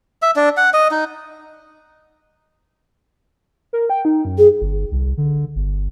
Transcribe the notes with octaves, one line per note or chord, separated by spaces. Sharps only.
E5
D4
F#5
D#5
D#4
A#4
G5
D#4
F#2
G#4
G1
C2
D3
G1